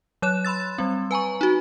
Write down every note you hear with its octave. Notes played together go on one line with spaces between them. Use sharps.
F#3 C#5 F#6 E7
B5 C6 E6 A6
G3 C4
B4 G#5 A#5 C#6
D#4 F#4